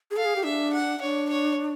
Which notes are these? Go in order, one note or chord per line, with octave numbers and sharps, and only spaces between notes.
G#4
A4 F5
G#4
G4
D4 E5
F#5
D4 C#5
C#5